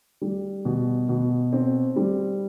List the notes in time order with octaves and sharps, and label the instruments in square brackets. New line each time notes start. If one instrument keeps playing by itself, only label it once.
[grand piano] G3
B2
B2
C4
G3